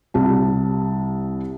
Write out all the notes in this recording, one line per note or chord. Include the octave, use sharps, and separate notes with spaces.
C2 G3 A5